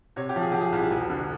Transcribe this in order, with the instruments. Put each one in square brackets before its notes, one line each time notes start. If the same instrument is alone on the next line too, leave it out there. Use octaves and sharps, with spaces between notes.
[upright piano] C3 C#5
G4
F3
G#4
F3 G4
G#4
C2
E1
D3